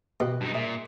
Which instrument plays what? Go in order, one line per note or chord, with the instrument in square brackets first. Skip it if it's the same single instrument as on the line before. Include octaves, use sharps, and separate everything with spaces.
[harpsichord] B2 [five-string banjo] G4 B4 D#5
[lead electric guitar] G2 D#4
[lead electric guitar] A#2 [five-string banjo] G#4 E5